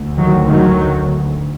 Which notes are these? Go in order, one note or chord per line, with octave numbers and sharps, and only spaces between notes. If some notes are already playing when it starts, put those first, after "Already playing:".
Already playing: D2
D#3 F#3
D#3 F#3